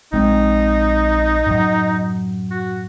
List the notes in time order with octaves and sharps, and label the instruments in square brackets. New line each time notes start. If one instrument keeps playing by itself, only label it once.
[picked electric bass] A#1 G#3 C4 [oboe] D#4
[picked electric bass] F#2 A2 F#3
[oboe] F#4